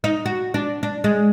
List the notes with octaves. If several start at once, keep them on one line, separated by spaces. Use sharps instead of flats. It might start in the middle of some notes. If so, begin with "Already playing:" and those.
D#4
F#4
D4
D4
G#3